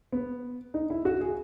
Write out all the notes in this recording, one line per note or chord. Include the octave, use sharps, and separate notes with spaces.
B3
D#4
E4
F#4
G#4